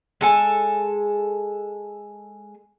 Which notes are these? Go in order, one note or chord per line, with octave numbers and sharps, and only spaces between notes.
G#3 A4 G#5